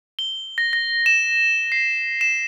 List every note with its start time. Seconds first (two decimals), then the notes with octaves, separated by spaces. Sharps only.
0.19 G7
0.58 A#6
0.73 A#6
1.06 E7
1.72 C7
2.21 E7